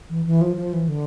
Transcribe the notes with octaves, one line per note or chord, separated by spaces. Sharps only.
E3
E3
F3
F3
E3
D3